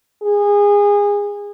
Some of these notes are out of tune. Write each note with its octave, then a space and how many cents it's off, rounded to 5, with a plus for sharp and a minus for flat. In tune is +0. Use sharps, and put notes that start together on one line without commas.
G#4 -25